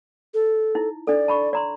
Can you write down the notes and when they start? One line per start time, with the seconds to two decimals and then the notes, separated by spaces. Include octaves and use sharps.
0.34 A4
0.75 D#4 E4
1.07 D4 A4 D5
1.28 A5 B5 C#6
1.53 D5 A#5 C6